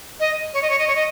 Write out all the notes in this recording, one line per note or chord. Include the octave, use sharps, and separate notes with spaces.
D#5
C#5
D#5
C#5
D#5
C#5
D#5